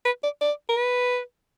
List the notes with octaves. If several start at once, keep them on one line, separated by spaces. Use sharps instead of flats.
B4
D5
D5
A#4
B4